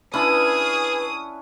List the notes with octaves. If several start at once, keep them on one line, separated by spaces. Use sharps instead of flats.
C#4 D4 E4 G#4 B4 D#6